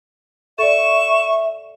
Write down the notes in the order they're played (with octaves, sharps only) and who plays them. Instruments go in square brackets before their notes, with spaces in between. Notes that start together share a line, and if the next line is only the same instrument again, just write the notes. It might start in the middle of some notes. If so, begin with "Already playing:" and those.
[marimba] A4 D5 [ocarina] E5 [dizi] C#6 [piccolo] E7